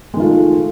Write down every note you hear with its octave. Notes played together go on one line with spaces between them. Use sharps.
D#3 G#3 A3 F4